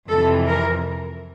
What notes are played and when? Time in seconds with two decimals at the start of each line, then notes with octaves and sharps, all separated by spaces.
0.10 F2 C3 E3 A4
0.47 A#4